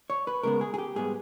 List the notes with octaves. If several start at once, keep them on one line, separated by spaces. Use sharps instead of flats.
C#5
B4
C#3 G#3 B3 A#4
G#4
G#4
G4
G#2 G3 B3 G#4